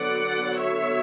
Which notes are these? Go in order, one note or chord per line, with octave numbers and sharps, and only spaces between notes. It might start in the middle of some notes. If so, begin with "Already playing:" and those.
Already playing: D3 F#3 B3 D5 F#5
C#5 E5